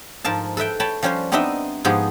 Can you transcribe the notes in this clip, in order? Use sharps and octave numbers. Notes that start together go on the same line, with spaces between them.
G#2 F3 A#4 A5
A4 B4 E5 G5
C#5 G5 A5 B5
F3 G3 C#4 B4 C5
B3 C4 D4 D#4 D#5 E5
G#2 F3 B3 G4 G#4